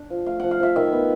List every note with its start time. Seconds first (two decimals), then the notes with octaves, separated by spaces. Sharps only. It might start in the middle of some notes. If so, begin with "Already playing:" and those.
Already playing: D4
0.10 F3
0.26 A3 F5
0.40 F3 F#5
0.51 F5
0.60 F3 E5
0.76 D#3 E5
0.92 B3